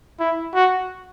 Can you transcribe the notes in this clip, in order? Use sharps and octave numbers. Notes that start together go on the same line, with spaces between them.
E4
F#4